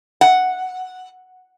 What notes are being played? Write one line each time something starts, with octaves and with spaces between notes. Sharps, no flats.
F#5